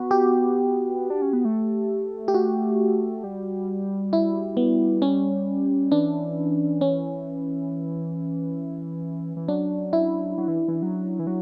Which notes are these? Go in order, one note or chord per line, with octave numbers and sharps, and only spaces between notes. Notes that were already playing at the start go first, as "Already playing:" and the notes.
Already playing: B3 F#4
G4
D4
C#4
B3
A3
G4
F#4
G3
E4
B3
C#4
E3 D4
C#4
E3
F#3 D4
E4
F#3
E3
E3
F#3
E3
F#3